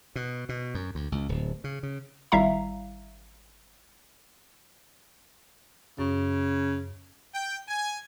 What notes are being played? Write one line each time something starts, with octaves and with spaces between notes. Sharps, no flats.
B2
B2
F#2
D2
C#2
D1
C#3
C#3
G#1 G3 E4 E5 F5 A#5
F#2 C#3
G5
G#5